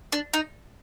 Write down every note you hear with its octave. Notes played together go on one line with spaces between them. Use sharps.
D4
D#4